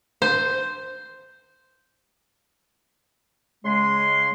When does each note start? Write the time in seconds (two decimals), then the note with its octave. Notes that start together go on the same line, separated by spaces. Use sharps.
0.22 C5
3.65 C#3 G#3 C6